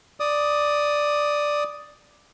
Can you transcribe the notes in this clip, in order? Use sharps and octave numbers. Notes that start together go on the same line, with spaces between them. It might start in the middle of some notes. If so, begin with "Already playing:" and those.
D5 D#6